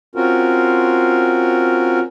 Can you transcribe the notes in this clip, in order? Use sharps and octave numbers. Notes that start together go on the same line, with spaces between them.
C4 C#4 F4 F#4 A#4